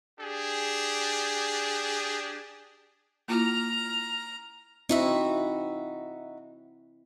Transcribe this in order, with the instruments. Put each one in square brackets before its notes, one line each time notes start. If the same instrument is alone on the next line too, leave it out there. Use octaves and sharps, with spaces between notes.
[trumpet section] D4 G4 G#4
[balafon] A#3 E4 F4 [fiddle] A#5 F6
[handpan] C4 E4 [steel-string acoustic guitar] D#4 F#4 E5